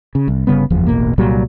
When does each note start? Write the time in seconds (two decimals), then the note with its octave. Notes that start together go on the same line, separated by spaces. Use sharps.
0.15 C#3
0.28 C2
0.47 G1 C#3 G3 B3
0.70 F#1 E2 F3
0.87 E1 A1 B2 A#3
1.18 C2 A#2 F#3 G3